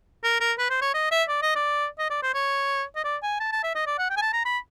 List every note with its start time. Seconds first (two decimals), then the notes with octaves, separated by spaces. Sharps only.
0.23 A#4
0.40 A#4
0.58 B4
0.70 C5
0.81 C#5
0.94 D#5
1.11 E5
1.28 D5
1.42 D#5
1.55 D5
1.99 D#5
2.10 D5
2.22 C5
2.34 C#5
2.96 D#5
3.04 D5
3.23 G#5
3.40 A5
3.52 A5
3.63 E5
3.75 D#5
3.87 D5
3.98 F#5
4.10 G5
4.17 G#5
4.22 A5
4.33 A#5
4.45 B5